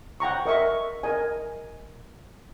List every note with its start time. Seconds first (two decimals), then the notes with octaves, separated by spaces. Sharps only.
0.20 F#5 G5 A#5 C#6
0.46 A#4 D#5 E5 C#6
1.03 A#4 D#5 G#5